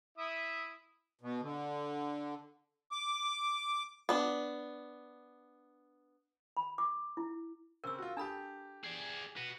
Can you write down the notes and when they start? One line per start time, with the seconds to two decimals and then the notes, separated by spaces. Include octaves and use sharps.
0.18 E4 E5 D#6
1.21 B2
1.42 D3
2.92 D6
4.09 B3 D4
6.57 B5
6.78 D6
7.17 E4
7.84 C#3 C4 A#4 E6
7.99 F4 F#4
8.17 D4 G4 A4 A5 B5
8.84 G#4 D5
9.37 F#4 B4